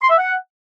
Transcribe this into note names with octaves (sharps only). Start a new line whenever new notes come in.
C6
E5
F#5